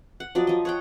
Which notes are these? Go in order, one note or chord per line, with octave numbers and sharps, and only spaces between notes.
F#5
F3 F#3 D5 D#5
F3 D#5
C#5 F#5 G5